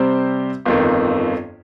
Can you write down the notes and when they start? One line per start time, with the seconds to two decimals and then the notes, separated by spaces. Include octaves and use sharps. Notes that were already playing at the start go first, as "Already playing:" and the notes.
Already playing: C3 G3 C4 G4 C5
0.66 G1 F2 D#3